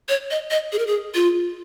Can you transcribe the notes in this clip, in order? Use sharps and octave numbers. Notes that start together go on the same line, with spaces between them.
C#5
D#5
D#5
G#4
A#4
G#4
F4